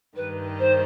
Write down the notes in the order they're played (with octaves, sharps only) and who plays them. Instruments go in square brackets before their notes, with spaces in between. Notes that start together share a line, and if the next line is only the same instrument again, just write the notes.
[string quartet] G2 D#3 G3 [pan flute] B4
[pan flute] C5